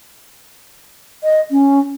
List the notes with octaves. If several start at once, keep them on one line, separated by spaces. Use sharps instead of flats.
D#5
C#4